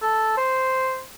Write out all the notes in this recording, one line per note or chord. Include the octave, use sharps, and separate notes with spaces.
A4
C5